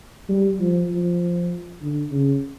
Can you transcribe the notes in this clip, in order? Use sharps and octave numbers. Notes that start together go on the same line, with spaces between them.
G3
F3
F3
D3
C#3